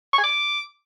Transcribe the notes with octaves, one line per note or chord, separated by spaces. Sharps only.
C#6
G#5
D6